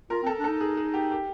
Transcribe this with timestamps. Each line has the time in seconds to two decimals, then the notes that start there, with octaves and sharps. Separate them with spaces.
0.10 F4 A#4
0.23 C4 A4
0.40 D4
0.44 D#4 A4
0.61 G#4
0.77 G#4
0.94 G4
1.11 G4